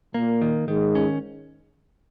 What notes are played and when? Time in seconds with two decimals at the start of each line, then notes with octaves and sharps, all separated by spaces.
0.14 A#2 A#3
0.41 D#3
0.68 G#2 D#3
0.95 C#4